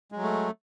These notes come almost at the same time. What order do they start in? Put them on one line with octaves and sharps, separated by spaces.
G#3 F#3 A3